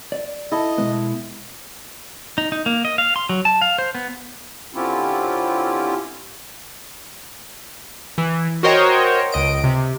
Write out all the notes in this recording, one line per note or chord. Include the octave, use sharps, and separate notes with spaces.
D5
E4 A4 D#5
B2 G#3 B3
D#4
D#4
A#3
D#5
F5
C6
F#3
A5
F5
C5
B3
D3 C4 C#4 E4 F4 G4
E3
F#4 A#4 C5 C#5 D#5 G5
C#2 D#5 D7
C3